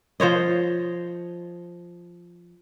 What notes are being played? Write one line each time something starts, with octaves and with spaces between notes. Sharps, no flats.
F3 C5 C#5 D#5